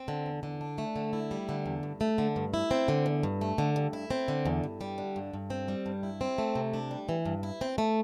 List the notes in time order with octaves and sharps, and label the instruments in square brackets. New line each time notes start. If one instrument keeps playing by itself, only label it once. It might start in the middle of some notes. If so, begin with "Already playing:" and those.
Already playing: [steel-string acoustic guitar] C4
D3
E2
D3
D4
A3
D3
E4
G3
D3
E2
G2
A3
D3
G2
E4
C4
D3
E2
G2
A3
D3
G2
E4
C4
D3
E2
G2
G3
D3
G2
G2
C4
G3
G2
E4
C4
A3
C3
D4
G3
E3
G2
E4
C4
A3